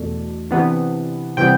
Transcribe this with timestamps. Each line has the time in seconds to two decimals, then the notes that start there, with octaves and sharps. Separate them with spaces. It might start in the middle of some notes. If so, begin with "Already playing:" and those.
Already playing: E2 B2 A3 D4
0.51 C3 E3 B3 D4
1.37 C3 E3 G3 B3 G5